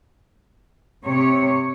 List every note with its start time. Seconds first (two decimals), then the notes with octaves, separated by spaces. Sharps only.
1.04 C3 C#5